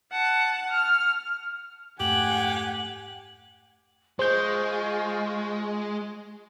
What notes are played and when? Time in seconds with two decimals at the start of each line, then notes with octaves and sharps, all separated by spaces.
0.12 F#5 A5
0.72 F6
2.00 F2 G#2 A3 G4 F#5 G#5 F#7
4.19 G#3 F4 C5 D#5 C#6 G6